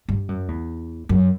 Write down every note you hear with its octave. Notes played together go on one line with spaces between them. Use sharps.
G2
F#2
E2
F#2